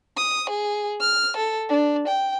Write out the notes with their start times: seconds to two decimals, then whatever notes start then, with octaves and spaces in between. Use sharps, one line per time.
0.17 D#6
0.50 G#4
1.00 F6
1.37 A4
1.69 D4
2.07 G5